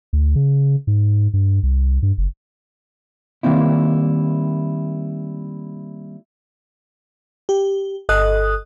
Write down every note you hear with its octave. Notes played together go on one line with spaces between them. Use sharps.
D2
C#3
G#2
G2
C2
G2
F#1
D#3 G3 A#3 C4 E4
G4
G1 A4 D#5 D#6 F#6